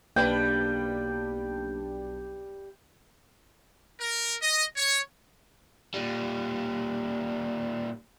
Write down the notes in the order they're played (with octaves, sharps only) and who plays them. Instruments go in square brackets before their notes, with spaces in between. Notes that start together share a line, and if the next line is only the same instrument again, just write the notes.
[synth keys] B1 D4 [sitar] G3 B4 [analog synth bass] A#3 [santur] G5
[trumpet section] A#4
D#5
C#5
[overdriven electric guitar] A#2 G3